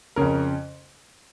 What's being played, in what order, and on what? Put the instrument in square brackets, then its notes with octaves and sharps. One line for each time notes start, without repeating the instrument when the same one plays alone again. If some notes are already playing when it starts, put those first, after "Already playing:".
[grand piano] F2 C#3 A#4